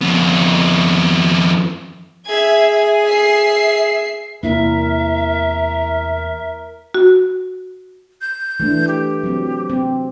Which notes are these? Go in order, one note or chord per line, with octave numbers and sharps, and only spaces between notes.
F2 B3
G#4 E5 G#6
E5 C7
E2 C3 A#3 E4 A#4 E5
F#4
G6
E3 A3 D4
G4
F#3 C4
C4